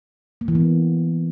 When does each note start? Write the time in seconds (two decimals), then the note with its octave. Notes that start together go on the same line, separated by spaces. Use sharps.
0.41 A#3
0.48 E3
0.55 B3